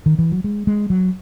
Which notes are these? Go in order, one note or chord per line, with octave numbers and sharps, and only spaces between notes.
D#3
E3
F#3
G#3
G#3
F#3